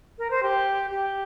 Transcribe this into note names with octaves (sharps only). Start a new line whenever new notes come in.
A#4
C5
G4
G4